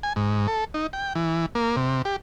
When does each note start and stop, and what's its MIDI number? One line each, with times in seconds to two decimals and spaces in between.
0.03 0.13 80
0.16 0.47 44
0.48 0.64 69
0.74 0.87 63
0.93 1.13 79
1.15 1.46 52
1.55 1.76 58
1.77 2.02 48
2.05 2.16 67